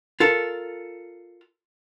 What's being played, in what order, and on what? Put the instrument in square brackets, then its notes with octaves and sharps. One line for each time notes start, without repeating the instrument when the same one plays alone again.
[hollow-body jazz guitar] F4 A4 A#4